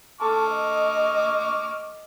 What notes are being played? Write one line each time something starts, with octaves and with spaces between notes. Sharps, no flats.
A4 C#6 D6 F6
D#5